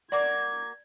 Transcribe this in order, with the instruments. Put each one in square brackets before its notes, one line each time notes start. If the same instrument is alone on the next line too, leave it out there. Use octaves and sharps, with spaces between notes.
[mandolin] A#3 F#4 [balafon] D5 [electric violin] G#6